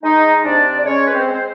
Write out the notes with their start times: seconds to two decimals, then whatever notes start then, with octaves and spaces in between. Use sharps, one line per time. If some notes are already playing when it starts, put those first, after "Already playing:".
0.03 G#3 D#4 D#5
0.44 C3 D4 D5
0.77 D5
0.85 G#3 C#4 C#5
1.07 B4
1.13 C4 C5
1.27 G#3
1.32 C5